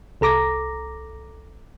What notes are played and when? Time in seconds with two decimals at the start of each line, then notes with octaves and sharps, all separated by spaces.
0.21 C2 A4 A#5 D6 A#6